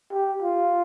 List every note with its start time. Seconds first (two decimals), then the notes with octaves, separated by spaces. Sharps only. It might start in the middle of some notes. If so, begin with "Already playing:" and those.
0.12 G4
0.42 F4